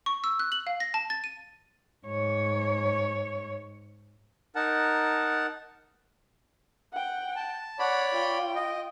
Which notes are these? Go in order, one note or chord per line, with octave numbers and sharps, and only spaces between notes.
C#6
E6
F#6
F#7
F5
A#6
A5
A6
D#7
G#2 C#5
D#4 A#4 F#5 A5
F#5 G5
A5
C#5 D5 F#5 B5
F4 G5
D#5